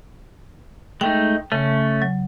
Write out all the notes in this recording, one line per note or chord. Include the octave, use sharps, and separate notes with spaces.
G#3 A3 D#4 G5
C#3 A3 C#4
F#3